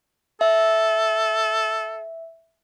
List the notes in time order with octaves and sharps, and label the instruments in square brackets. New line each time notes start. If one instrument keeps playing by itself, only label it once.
[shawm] A4 [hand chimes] E5